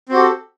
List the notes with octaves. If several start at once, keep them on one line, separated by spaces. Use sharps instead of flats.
C4 F#4 G4 A4